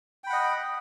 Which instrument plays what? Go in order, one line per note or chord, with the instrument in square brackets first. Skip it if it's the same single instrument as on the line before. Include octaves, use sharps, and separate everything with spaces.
[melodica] G5
B5
F#5
D#5